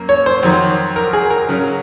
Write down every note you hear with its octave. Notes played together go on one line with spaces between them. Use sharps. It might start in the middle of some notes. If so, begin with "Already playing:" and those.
Already playing: F#2 A#3
C#5
C5
F2 D#3 F#3
A#4
G#4
A#4
C#3 F#3 C#4